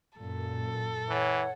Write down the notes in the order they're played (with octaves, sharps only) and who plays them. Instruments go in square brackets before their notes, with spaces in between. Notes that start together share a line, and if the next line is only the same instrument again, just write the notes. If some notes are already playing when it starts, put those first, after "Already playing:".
[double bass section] F#2 A#2 [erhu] A4
[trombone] E3 [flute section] C#5 F#5